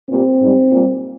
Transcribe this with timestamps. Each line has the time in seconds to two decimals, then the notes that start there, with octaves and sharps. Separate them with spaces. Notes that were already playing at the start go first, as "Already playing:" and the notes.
0.10 A#2 G3 C4
0.41 G#2 G3
0.71 A#2 G3